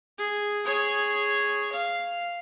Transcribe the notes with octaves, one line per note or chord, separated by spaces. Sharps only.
G#4
G#4 C#5
F5